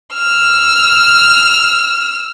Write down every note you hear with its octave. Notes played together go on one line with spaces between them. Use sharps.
E6 F6